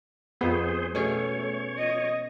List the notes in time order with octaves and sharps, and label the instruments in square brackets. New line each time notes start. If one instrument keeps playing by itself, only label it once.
[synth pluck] F2 B3 [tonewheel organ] G#4 C5
[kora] B2 C#4 G#4 [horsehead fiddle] A3 [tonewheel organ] C#5
[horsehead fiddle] D#5